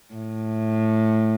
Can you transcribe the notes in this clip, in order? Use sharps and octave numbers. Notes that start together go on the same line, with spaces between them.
A2